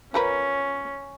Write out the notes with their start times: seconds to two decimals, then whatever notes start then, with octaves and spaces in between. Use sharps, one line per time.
0.14 F3 C#4 A#4 B4